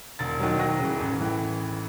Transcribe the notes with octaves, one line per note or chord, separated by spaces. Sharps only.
E1 A6
D#2 D#3 F#3
D#2 A#6
C#3 E3
A1
A2 E3